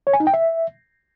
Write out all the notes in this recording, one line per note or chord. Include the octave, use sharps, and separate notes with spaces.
C#5
G#5
D#4
G5
E5